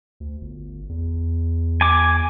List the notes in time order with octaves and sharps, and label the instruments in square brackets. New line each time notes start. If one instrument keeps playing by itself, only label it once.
[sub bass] D2
G1
E2
[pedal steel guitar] G#5 D6